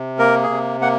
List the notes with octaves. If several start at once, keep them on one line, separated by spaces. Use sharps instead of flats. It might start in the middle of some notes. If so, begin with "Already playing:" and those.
Already playing: C3
A#3 A#4
G#4
C3
A#3 F#5